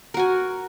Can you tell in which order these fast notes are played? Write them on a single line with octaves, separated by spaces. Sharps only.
A#4 F#4 G#5